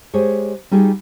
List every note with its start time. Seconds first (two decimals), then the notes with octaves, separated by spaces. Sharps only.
0.14 G#3 G4 G#4 C5 C#5
0.71 G3 D#4 F4 F#4 G#4